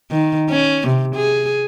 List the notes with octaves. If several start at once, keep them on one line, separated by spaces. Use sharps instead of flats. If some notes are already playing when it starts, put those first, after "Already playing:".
D#3
C#4
C3
G#4